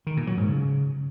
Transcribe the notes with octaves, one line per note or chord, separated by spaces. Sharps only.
D#3
A#2
F#3
G#2
C#3